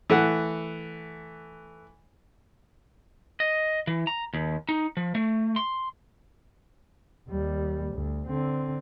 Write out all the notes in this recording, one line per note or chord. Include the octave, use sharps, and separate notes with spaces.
E3 A3 F#5
D#5
E3
A#5
D#2
D#4
F3
A3
C6
D#2 G3
D2
D3 C4